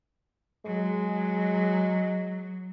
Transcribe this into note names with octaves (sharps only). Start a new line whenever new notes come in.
F#3 G#3